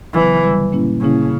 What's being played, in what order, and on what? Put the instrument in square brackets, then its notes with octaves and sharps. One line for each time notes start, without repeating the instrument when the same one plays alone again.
[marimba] C#3 F#3 B3 [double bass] E3
[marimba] G2 D3 G3
A#2 A#3 C#4 E4
[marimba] A#2 A#3 C#4 E4 [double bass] C#3